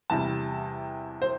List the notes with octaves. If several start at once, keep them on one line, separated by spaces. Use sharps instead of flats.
E2 C3 G3 A5
C5